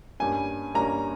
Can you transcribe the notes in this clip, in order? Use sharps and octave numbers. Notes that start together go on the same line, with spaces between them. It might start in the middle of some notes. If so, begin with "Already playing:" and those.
G2 G3 A#3 C#4 G#5
G2 G3 A#3 C#4 A#5